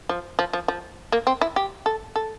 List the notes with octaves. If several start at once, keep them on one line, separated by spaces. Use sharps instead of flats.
F3
F3
F3
F3
A#3
C4
E4
G4
A4
A4